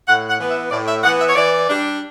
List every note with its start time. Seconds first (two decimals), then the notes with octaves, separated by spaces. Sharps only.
0.07 A2 F#5
0.28 F#5
0.38 E3 B3
0.50 E5
0.70 A2 D5
0.87 E5
1.03 E3 B3 F#5
1.20 E5
1.28 C#5
1.35 E3 D5
1.67 G3 D4